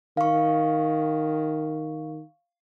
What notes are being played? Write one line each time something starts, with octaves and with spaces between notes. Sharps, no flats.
D#3 F5 C#6